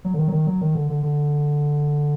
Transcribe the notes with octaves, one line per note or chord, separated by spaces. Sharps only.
F#3
D3
D#3
F#3
D#3
F#3
D#3
D3
D3
D3